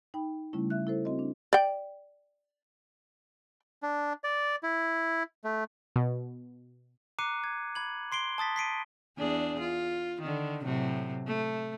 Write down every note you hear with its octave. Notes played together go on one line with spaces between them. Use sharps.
D#4 G5 B5
C#3 G3 A3 C#4 E4
E5 F#6
E4 A4 C5
C4 F#4 D#5
D4
D5 G5
D4
D5
E4
A3
B2
A#5 D6 F#6 C7 C#7 D#7
G#6
B5 G#6 F#7
C6 C7 D7 G7
A5 D#6 A6 B6
B6 C7 D7 D#7
E2 D4 G#4
F4
D3 D#3
A2 C3 F#3
A3